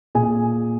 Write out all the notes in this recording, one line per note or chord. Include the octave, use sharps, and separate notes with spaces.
A#2 G#4 G#5